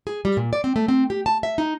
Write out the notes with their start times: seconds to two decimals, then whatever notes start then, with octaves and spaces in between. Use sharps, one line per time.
0.07 G#4
0.25 G3
0.37 A#2
0.53 D5
0.64 C4
0.76 A3
0.88 C4
1.10 G4
1.26 A5
1.43 E5
1.58 D#4